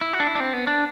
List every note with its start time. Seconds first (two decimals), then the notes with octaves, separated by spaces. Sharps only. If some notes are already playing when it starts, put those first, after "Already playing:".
0.01 E4
0.13 F#4
0.20 D4
0.27 E4
0.35 D4
0.40 C4
0.53 B3
0.67 D4